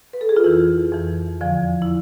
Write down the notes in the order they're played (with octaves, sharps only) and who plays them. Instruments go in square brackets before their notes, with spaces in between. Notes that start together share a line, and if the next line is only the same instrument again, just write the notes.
[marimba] B4
A4
G#4
F4
F2 E3 E4
F2 E3
E2 D3 F3
E4